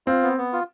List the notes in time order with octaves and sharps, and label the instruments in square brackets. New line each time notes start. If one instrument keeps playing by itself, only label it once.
[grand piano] C4 [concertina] F4
[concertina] B3
B3
F4